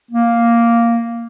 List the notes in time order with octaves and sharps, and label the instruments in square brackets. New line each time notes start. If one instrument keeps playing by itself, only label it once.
[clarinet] A#3